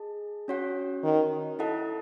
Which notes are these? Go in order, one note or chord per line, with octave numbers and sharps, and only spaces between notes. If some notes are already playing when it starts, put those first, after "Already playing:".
Already playing: G#4 D#5 A5
C#4 F#4 C#5 F#5
D#3
E4 A4 D#5 F#5 A5